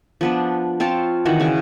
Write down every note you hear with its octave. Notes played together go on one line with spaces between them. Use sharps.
F3 B3 D4
C4 F4 C#5 A5
D#3 E3 F#4 F#5
C#3 G#5